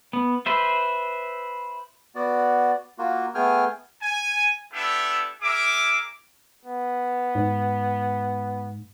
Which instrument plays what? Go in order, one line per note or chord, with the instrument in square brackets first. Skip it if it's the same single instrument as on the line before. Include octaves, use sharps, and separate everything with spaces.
[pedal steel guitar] B3
B4 C5 E5
[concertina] B3 F#4 D5
A#3 F4 F#4
A3 B3 G#4 G5 G#5 F6
[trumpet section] G#5
B3 D4 E4 G4 A4 E5
G#4 A#4 E5 D6
[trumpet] B3
[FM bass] G#2